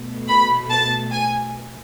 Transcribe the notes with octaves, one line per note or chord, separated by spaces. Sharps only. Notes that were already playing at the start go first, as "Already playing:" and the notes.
Already playing: B2 A3
B5
A5
G#5